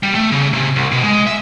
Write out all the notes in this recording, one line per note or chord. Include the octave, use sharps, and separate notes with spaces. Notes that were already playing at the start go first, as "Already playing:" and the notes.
G3
A3
C#3
C3
C2
B2
G#3
E5